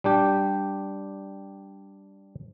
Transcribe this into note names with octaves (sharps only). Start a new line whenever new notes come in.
G3 D4 G4 G5